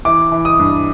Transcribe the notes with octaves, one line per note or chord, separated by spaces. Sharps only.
E3 D6
E3
D#6
G2